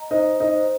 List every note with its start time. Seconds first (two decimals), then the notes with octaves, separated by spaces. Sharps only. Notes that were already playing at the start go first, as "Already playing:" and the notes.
Already playing: D#5 A#5
0.11 D#4 C5
0.40 D#4
0.55 C5